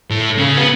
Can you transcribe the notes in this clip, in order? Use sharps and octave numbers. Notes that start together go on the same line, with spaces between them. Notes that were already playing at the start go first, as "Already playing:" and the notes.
A2
C#3
B3